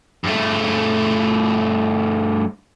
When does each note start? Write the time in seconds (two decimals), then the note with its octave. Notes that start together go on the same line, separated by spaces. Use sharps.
0.25 G2 A3